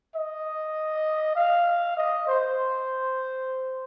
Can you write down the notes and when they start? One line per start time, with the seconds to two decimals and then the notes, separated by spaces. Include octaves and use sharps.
0.16 D#5
1.36 F5
1.97 D#5
2.27 C5